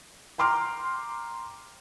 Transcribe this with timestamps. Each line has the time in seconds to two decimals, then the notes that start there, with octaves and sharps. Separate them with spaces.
0.38 G5 A#5 C6 D6 F6